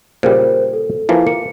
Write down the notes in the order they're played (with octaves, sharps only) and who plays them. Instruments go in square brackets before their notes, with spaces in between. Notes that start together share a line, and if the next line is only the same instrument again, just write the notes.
[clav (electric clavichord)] A#2 C#3 G3 [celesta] A#4 C5
[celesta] A4
[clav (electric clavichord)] E3 F3 A#3
[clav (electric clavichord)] A#3 [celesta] C#7